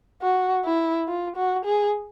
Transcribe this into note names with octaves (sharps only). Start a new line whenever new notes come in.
F#4
E4
F4
F#4
G#4